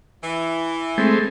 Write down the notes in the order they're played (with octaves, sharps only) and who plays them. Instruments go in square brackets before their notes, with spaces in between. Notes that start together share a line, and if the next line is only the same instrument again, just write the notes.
[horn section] E3
[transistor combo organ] G#3 A3 C4